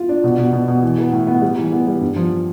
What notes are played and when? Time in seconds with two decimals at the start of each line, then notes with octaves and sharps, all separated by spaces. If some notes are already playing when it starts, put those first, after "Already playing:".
Already playing: F4
0.09 D4
0.24 B2
0.38 B2
0.53 B2
0.68 B2
0.83 E3
0.98 B3
1.13 A2
1.27 B3
1.42 G3
1.58 E3
1.72 B3
1.87 G3
2.01 G2
2.16 F3